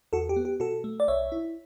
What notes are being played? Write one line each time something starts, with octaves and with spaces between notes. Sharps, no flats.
E2 F#4 A4
G4
B3
G4
B2 F#4 A4
A3
D5
B1 C#5 E5
E4